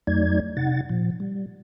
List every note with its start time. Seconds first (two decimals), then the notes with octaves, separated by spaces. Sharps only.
0.07 F2 F#3 A3 D#4 D5 G#6
0.57 C3 D#4 F#5 A6
0.89 A#2 F3
1.20 G3